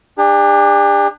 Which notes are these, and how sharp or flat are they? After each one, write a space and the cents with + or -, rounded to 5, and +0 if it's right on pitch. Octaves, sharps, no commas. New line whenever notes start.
D4 +20 G4 +45